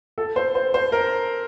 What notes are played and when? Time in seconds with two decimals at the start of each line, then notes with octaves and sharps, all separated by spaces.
0.18 A4
0.36 C5
0.55 C5
0.74 C5
0.92 A#4